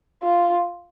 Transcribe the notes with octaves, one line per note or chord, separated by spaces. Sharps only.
F4